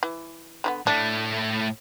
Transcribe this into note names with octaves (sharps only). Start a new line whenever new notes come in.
E3
D3 F#3 B3
A2 A3 D4